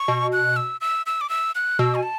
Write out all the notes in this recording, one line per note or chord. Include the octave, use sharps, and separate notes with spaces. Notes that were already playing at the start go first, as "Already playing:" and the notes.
Already playing: C#6
B2
F#6
E6
E6
E6
D6
E6
F#6
B2 E6
G#5
A5